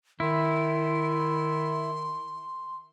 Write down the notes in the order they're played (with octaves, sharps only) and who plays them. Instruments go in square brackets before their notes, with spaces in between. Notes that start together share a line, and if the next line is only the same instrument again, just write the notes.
[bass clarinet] D#3 [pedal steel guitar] E4 [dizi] C6